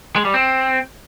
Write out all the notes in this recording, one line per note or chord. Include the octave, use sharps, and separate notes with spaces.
G#3
G3
C4